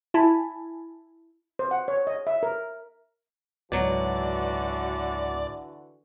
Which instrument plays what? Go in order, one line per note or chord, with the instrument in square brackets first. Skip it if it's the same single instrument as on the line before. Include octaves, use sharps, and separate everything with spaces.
[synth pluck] E4 G#5 A5 B5
[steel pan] C5
F#5
C#5
D#5
E5
A#4
[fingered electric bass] C#2 G#2 [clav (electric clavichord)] B2 F#3 [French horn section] D3 E3 F#4 [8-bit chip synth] D5